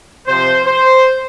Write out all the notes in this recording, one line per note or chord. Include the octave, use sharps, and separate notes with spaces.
C3 F3 C5
C5